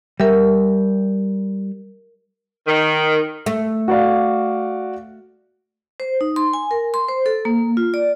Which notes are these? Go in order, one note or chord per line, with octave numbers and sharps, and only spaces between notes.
G3 A#4 E5
D#3
A3
F#4 D5 F5
C5
D#4
C6
G#5
A#4
C6
C5
A4
A#3
F4
D5